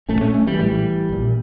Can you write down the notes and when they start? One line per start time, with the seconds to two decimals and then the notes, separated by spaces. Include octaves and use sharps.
0.09 A#1 A2 A3 C#4
0.21 A3 C#4
0.34 A3 C#4
0.46 E3 G3
0.59 A#1 A2 E3 G3
1.09 A#1 A#2